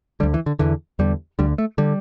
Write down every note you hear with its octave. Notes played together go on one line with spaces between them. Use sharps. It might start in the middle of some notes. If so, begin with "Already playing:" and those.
D2 D3 G3
E3
D3
E2 D3 E3
E2 D3 G3
D2 D3 G3
A3
D3 G3